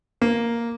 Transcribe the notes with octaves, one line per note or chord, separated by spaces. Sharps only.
A#3